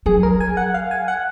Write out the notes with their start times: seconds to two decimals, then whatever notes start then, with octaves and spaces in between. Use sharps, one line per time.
0.06 F#3 G#4
0.23 A#4
0.40 G#5
0.57 F#5
0.74 F5
0.91 G#5
1.08 F#5